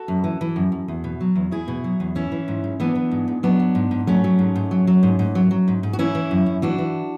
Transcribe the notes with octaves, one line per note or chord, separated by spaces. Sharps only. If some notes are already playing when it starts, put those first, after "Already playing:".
Already playing: F#4 A4
F#2
E3
E3
F#2
F#2
E2
B2
F#3
E2
E2 E4 G#4
B2
F#3
E2
E3 C#4 E4
E3
G#2
G#2
E3 B3 D4
E3
G#2
G#2
F#3 B3 D4
F#3
G#2
G#2
F#3 A3 C#4
F#3
G#2
G#2
F#3
F#3
G#2
G#2
F#3
F#3
G#2
G#2
F#4
E3 C#4 E4
E3
F#2
F#2
E3 D4 F#4
E3